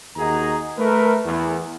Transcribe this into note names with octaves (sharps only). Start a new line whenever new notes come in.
D#2 D#4 F#4 G#4 A#5
A3 A#4 B4
E2